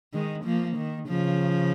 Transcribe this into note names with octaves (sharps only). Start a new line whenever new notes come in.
D#3 G#3
F3 A#3
D#3
C#3 F3